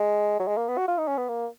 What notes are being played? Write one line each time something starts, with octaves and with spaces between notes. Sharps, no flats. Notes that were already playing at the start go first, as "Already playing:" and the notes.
Already playing: G#3
F#3
G#3
A#3
B3
F#4
F4
D#4
C#4
B3
A#3